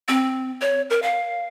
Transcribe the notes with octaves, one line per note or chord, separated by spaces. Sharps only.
C4
C#5
A#4
F5